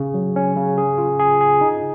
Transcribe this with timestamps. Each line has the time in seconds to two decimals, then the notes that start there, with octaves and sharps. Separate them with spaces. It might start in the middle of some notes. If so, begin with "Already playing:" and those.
Already playing: C#3
0.14 F#3
0.36 C#4
0.56 C#3
0.78 G#4
0.98 F4
1.20 G#4
1.41 G#4
1.61 D#4